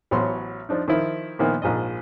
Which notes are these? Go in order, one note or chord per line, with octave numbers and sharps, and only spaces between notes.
A1 F#3 B3 C5 C#5 C6
F3 D4 D#4
D#3 F3 E4
A#2 D#3 F3 A#3 B3 E4
A#1 G#2 D#5